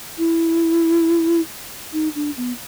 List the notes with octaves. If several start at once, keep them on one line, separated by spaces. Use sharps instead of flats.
E4
D#4
D4
B3